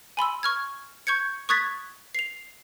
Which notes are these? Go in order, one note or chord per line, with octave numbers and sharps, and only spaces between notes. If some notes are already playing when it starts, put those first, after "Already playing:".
G#5 B5 C6 E6
C#6 F6 G#6
C#6 G6 G#6 C#7
C#6 D#6 F#6 G#6 A6 B6
C7 F7